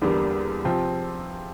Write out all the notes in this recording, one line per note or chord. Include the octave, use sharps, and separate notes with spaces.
E2 D3 G3 A#3
C3 F3 C4 F4